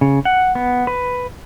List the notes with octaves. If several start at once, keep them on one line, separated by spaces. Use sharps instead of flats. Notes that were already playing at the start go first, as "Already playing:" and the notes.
C#3
F#5
B3
B4